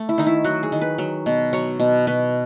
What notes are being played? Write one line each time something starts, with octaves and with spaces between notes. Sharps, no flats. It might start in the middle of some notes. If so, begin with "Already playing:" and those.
Already playing: A3
E4
D#3 D#4
E4
F#3 F#4
G#4
D#3
B4
F#3
B2
F#3 C#5
B2
B2 B4